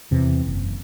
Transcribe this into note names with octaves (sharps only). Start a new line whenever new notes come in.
E2 C3 E3
F#1